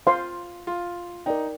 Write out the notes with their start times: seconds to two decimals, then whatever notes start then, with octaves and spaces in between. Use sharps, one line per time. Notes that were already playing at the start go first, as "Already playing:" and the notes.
0.07 F4 C5 F5 C6
0.67 F4
1.26 D#4 A#4 D5 G5